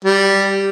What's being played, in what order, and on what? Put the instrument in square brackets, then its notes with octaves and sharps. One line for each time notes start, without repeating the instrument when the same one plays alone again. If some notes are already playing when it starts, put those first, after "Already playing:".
[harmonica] G3